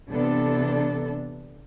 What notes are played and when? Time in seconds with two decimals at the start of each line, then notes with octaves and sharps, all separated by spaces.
0.10 C3 E3 B3 D4 A4